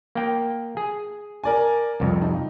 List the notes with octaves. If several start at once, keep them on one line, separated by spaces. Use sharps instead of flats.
A#3 G5
G#4
A#4 D5 G#5
C2 F2
D#4